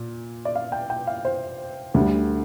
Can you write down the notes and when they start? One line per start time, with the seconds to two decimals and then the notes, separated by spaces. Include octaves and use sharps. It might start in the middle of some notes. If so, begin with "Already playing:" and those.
Already playing: A#2
0.45 D5
0.55 F5
0.72 G5
0.90 G5
1.07 F5
1.25 C5
1.94 D2 D3 G3